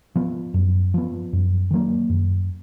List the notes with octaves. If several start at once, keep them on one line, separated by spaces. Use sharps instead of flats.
F3 B3
F#2
F3 B3
F#2
D#3 F#3 A#3
F#2